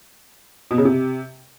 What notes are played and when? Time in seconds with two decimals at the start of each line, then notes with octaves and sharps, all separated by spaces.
0.71 B2
0.78 C#3
0.85 C3